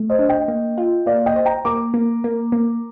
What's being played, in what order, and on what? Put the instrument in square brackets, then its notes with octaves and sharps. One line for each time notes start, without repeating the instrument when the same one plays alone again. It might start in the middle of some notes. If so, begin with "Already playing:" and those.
Already playing: [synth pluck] A3
[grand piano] C5 D#5
[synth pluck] D4
[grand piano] D#5 G5
[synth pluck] A#3
F4
[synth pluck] A#3 [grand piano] D5 F5
[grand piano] D#5 G5
[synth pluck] C5
[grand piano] G5 A#5
[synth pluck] A#3 [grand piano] A#5 D6
[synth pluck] A#3
A#3
A#3